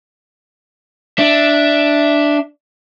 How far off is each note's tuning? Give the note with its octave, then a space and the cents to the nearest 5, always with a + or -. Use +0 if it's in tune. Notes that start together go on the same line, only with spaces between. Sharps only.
D4 +0 E5 +0